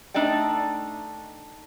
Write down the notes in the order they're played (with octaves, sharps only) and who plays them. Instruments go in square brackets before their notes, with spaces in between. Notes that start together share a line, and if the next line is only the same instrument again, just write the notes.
[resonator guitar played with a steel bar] A3 D4 D#4 D5 G5